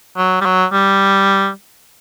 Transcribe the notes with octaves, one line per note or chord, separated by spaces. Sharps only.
F#3
G3
F#3
G3